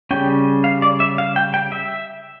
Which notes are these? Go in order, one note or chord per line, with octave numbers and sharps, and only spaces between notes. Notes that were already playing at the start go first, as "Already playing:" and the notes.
C#3 G3 C#4 G5
F5
D5
E5
F5
G5
G5
E5